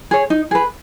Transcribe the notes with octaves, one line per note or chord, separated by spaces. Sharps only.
G#4 C#5
D#4
G#4 B4